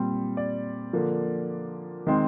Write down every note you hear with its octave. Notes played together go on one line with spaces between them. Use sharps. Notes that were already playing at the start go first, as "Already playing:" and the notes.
Already playing: A#2 G3 C4
D5
D3 F3 A#3
D#3 G#3 C4